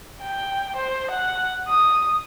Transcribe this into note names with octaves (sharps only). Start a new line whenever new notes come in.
G5
C5
F#5
D#6